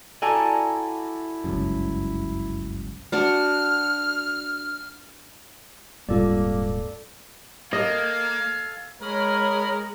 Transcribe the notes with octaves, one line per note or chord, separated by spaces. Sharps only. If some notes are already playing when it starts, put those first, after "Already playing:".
E4 F#4 G4 A4 D5 G#5 A#5
G1 C#2 F#2
D4 F#4 D5 F6
D#1 G#2 G3 A#3 C4 F4 A4 D5
A#3 A4 D#5 F5 G#5
G#3 A#4 C#5 B5 D#6 F6